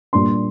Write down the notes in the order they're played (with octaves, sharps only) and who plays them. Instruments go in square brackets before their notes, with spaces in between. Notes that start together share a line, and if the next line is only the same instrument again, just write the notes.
[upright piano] A#2 G3 D4 C6